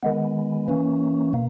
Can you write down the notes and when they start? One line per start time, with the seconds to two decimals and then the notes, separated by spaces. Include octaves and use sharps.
0.03 D#3 G#3 B3
0.68 E3 A#3 C#4
1.33 B2 A#3